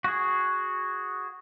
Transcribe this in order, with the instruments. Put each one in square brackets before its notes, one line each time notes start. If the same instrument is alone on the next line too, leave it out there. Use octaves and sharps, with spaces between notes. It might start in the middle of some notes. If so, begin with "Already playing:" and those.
[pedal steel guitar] F#4 G#4